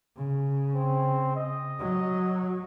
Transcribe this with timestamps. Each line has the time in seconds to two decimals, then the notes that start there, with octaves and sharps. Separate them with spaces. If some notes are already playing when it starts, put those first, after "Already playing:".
0.16 C#3
0.74 C4
1.36 D#5
1.79 F#3